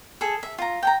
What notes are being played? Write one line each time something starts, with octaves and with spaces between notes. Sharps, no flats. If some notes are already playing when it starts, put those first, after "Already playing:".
G#4 A4
E5
F4 A#5
G5 A5 A#5